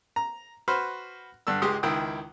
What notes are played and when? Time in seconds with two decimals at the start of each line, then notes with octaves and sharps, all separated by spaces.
0.16 A#5
0.68 F#4 B4 C5 F6
1.47 G2 D3 E6
1.62 C#2 G#3 G4 C6 D#6
1.83 C#2 D#3 E4 G5 D#6